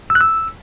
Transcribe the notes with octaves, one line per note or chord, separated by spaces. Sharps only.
E6
F#6
E6